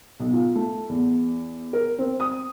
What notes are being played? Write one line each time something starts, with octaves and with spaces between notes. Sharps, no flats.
B1
F4
A3
E2
A#4
C4
D#6